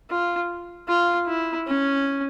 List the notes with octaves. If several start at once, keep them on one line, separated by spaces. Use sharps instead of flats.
F4
F4
E4
C#4